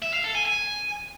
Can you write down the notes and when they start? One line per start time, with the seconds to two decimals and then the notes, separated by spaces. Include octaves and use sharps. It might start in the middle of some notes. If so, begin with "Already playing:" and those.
0.02 E5
0.13 F5
0.24 A4
0.35 G#5
0.46 G#5